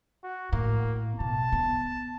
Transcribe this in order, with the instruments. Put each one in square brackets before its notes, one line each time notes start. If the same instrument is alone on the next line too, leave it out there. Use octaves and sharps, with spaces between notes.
[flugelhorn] F#4
[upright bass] A2 [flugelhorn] A#3
[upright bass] B2 [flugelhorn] A5
[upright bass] B3